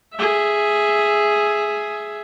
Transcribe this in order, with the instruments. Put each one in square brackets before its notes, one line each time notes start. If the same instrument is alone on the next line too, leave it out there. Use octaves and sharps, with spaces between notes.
[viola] G#4 E5